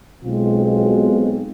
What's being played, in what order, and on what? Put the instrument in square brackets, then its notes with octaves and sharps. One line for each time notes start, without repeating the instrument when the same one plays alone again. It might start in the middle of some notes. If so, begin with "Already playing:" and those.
[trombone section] B1 B2 G#3 C4 F4